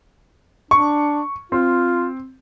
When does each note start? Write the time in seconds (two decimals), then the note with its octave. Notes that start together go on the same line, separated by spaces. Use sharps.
0.71 D4 C#6
1.52 C4 F4